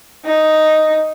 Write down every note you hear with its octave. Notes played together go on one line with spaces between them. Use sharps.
D#4